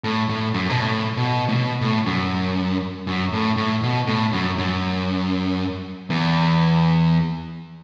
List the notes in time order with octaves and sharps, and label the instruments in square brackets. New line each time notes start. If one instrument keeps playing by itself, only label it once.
[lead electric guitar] A2
A2
F#2
B2
A2
B2
A2
B2
A2
F#2
F#2
A2
A2
B2
A2
F#2
F#2
E2